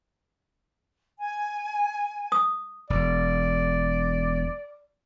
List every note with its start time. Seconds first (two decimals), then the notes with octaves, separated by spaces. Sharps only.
1.19 G#5
2.32 D#6
2.90 E1 D5